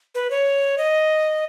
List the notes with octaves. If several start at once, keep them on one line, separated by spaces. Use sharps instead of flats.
B4
C#5
D#5